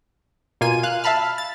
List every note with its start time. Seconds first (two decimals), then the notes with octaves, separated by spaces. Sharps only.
0.61 B2 A#3 F4 G#5 D#7
0.83 F5 F#6
1.04 E5 F5 A5 B5 F6
1.38 A6